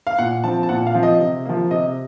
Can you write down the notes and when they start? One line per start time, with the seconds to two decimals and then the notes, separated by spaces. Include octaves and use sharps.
0.07 F5
0.18 A#2 F#5
0.44 F3 C4 A5
0.63 A5
0.69 A#2 F#5
0.87 F5
0.95 F3 C4
1.03 D#5
1.20 C3
1.46 F3 A#3
1.71 C3 D#5